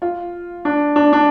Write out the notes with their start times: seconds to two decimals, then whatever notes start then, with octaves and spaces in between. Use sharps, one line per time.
0.02 F4
0.65 D4
0.96 D4
1.13 D4